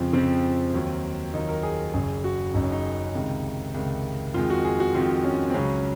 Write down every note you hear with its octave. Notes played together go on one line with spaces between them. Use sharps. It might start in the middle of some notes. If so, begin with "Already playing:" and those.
Already playing: F2 C#3 F3 C4
F2 C#3 F3 C4
D#2 D#3 F#3
D#2 D#3 F#3 D#4
A#4
G#4
A#4
F#1 F#2 C#3 G#4
F#4
F#1 F#2 C#3 D#4
C#4
D#4
C#2 C3 D#3
C#2 C3 D#3
F2 D#3 G#3 F4
F#4
G#4
F#4
F2 D#3 G#3 F4
C#4
C4
C#2 C#3 F#3 C#4